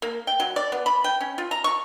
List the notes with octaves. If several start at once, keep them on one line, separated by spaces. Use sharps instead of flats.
A#3
G5
F#3
D5
B3
B5
G5
C#4
F4
A#5
C#6